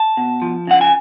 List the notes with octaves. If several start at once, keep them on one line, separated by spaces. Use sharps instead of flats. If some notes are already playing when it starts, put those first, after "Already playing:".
Already playing: A5
B2
F3
C#3 F#5
G#5